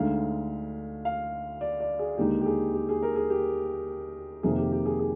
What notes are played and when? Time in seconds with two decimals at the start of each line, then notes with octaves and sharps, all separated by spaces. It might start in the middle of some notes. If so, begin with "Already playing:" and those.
Already playing: D2 D3 G#3 D#4 F5
1.05 F5
1.61 D5
1.80 D5
1.99 G#4
2.17 D#2 D3 G#3 D#4 G4
2.41 G4
2.46 G#4
2.74 G4
2.89 G#4
3.03 A#4
3.16 G#4
3.30 G4
4.43 F2 C3 D#3 A#3 G#4
4.58 G4
4.72 G4
4.86 G#4
4.99 G#4